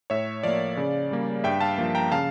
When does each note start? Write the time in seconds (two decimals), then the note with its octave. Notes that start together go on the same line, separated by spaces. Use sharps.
0.10 A2 C#5 E5
0.43 F3 A#3 D5 F5
0.77 C#3
1.11 G3 A#3
1.44 G2 E5 G5
1.61 F5 A5
1.78 F3 A#3
1.95 G5 A#5
2.11 C#3 F5 A5